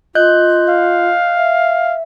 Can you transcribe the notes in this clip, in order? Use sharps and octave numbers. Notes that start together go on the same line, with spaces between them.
F4 D#5 F#6 G6
F5
E5